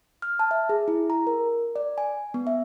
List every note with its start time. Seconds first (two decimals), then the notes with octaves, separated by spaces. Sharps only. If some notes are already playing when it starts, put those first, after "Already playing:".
0.22 F6
0.39 A5
0.51 E5
0.69 G#4
0.88 E4
1.10 A#5
1.27 A#4
1.76 D5
1.98 G#5
2.34 B3
2.47 E5